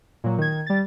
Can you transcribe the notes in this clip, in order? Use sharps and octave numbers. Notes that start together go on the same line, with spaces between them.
A#2 F#3
D#3 G#6
G3 A6